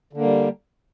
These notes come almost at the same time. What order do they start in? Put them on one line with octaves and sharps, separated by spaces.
D3 A#3 G3